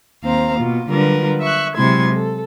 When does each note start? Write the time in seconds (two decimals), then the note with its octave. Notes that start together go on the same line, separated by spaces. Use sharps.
0.24 D#2 C4 C5 F5 A#5
0.59 B2 A#3 F4
0.89 D3 F#3 G3 F4 A#4 B4
1.40 E5 C#6 F#6
1.76 C3 F#3 G#3 E4 C6 G#6
2.13 A4